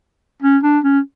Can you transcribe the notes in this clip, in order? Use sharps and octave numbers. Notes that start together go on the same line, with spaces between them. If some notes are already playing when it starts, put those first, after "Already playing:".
C#4
D4
C#4